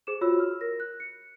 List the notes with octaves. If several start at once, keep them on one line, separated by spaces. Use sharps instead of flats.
G#4 C5 D6 E7
F4 F#4 C#5 B5 E6
F6
A#4 A#6
F#6
C#7